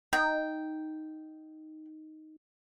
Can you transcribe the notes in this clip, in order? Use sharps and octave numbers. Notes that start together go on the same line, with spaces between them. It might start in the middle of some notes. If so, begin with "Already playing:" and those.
D#4 G5